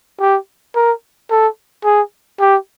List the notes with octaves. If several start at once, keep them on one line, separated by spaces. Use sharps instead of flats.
G4
A#4
A4
G#4
G4